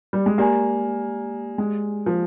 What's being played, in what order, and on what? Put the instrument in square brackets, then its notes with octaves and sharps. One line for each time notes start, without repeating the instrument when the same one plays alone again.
[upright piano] G3
G#3
[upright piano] A#3 [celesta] G4 D5 G#5
[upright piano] G#3
F3